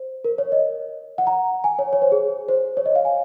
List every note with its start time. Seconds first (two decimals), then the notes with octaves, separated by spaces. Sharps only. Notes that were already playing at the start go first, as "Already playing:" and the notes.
Already playing: C5
0.25 A#4
0.38 C#5
0.52 D#5
1.18 F#5
1.27 A#5
1.64 G#5
1.79 C#5
1.93 C#5
2.02 C5
2.12 G#4
2.48 C5
2.77 C#5
2.86 D#5
2.96 F5
3.05 G#5